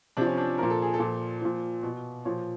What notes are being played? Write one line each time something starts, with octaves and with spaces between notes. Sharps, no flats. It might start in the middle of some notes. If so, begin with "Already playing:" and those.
C3 F3 D4
C#4
D4
A#2 F3 A#4
A4
G#4
A4
A#2 F3
A#2 F3
B2
A#2 F3 C#5